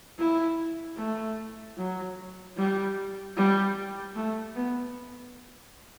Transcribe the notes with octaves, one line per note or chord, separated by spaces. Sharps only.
E4
A3
F#3
G3
G3
A3
B3